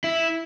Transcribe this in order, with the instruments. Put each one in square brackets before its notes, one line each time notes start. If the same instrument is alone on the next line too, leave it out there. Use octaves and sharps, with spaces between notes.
[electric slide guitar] E4